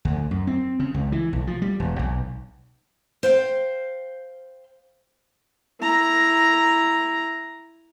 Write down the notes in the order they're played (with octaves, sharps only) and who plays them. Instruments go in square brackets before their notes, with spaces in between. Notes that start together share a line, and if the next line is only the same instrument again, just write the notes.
[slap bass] D2
F#2
C4
C#3
C#2
E3
B1
F3
G3
E1
B1
[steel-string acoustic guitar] C5 F5 G5
[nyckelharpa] E4 A#5